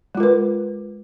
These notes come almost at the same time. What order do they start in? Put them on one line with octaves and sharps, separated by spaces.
G#3 F4 A#4 B4